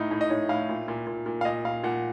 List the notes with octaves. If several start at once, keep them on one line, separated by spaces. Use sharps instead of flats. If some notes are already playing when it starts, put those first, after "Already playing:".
Already playing: A2 D#4
A2
D#5
A2 C#5
A2 F5
A#2
A#2
A#2
A#2
F5
A#2 D#5
A#2 F5
A#2 F#5